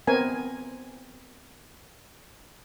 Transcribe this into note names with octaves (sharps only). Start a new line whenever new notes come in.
B3 C4 A#4 G#5